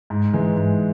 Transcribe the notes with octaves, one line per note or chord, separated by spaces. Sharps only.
G#2
E3 G#3
G#2